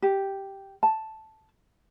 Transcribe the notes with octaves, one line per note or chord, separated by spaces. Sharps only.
G4
A5